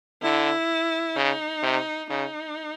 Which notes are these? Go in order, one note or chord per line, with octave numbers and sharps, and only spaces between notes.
D3 E4
C#3 D#4
C3
C#3 D#4